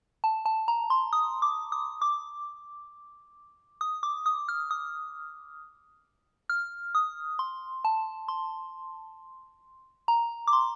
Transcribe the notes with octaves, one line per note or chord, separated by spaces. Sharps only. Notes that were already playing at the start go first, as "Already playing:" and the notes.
A5
A5
A#5
C6
D#6
D6
D#6
D6
D#6
D6
D#6
F6
D#6
F6
D#6
C6
A5
C6
A#5
D6
C6